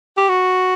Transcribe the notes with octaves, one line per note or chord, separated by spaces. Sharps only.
G4
F#4